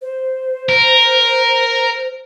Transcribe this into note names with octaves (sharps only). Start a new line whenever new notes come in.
C5
A#4